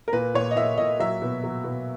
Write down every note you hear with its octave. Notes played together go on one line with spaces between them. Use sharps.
A#4
A#2 B4
A#2 C#5
D#5
A#2 E5
A#2 D#5
F#3 E5
B2
F#3
B2